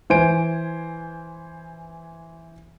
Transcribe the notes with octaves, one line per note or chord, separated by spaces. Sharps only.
E3 C5 G#5 D7